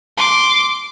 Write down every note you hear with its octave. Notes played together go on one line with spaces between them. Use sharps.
C6 D6